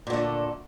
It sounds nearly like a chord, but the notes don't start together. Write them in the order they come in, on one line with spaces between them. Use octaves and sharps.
A#2 D3 A3